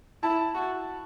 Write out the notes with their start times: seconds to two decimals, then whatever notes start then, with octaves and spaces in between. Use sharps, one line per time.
0.23 E4 A5
0.55 F#4